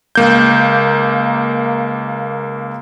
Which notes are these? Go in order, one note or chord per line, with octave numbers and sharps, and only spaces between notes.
C#2 A#3 G6